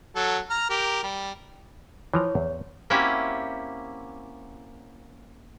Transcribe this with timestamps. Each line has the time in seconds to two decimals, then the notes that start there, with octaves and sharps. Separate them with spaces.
0.16 F#3 A4
0.50 A#5 F6
0.70 G4 A#4
1.03 G3
2.14 E3 F3 C#5 A#5
2.35 E2
2.90 A#3 C4 C#4 E4 F#4 G4